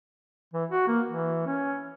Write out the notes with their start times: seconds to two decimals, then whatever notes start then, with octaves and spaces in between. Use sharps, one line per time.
0.53 E3
0.71 F#4
0.88 A#3
1.08 E3
1.46 C#4